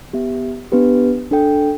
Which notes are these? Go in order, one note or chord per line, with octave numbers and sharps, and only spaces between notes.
B3 G4 E5
B3 D4 G4 B4
D4 A4 G5